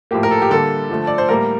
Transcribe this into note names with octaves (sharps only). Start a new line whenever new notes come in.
A2 F3 A#3 G4
A#4
A4
G4
D3 G3 A#3 A4
D3 F3 A3
D5
C5
A2 G3 A#3 A#4